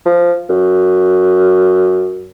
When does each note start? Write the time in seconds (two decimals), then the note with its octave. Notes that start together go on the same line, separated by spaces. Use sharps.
0.06 F3
0.49 F#2